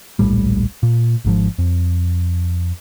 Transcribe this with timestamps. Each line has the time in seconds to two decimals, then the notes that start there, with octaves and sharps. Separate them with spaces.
0.19 D1 A#1 A2 G3
0.83 A#2
1.25 G#1 G#2 F3
1.58 F2